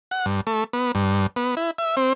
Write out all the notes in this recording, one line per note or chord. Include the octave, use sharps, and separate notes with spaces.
F#5
G2
A3
B3
G2
B3
E4
E5
C4